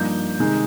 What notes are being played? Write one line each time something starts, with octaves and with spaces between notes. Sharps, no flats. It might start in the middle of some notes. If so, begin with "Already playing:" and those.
Already playing: G2 F3 A#3 D#4 G6
C3 D#3 G#3 D#4